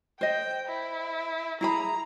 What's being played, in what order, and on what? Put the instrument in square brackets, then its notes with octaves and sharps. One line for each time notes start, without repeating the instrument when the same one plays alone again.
[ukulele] C5 D#5 [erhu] G5
[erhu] E4
[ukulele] E4 G#4 B5 [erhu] A#5